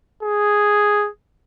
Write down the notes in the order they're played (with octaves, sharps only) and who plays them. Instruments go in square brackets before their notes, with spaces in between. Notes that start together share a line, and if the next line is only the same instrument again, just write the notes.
[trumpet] G#4